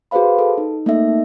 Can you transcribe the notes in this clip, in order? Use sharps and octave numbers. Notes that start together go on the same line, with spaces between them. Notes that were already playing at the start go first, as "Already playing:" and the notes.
F#4 G#4 B4 C5 F5 B5
A4
D#4
A3 A#3 C4 D#4 A4 E5